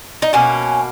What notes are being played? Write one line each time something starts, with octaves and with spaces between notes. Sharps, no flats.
D#4
B2 A#3 C#4